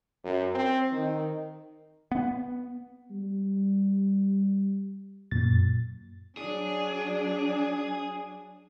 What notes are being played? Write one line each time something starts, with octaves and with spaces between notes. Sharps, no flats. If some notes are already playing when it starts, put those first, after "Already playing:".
F#2
C4
D#3
B3
G3
F#2 A#2 A6
F#3 D4 G#4